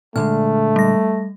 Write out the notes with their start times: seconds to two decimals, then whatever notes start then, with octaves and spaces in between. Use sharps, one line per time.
0.16 A#2 D3 G#3 A3 F6
0.76 G3 A#6